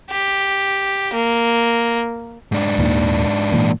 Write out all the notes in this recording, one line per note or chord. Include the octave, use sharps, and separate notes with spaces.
G4
A#3
G#2 D4
D#2 A#2 D#3
A#2 E3 A#3